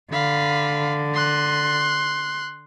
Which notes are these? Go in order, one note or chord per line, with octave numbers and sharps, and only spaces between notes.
D3 F5 B5
C6 F#6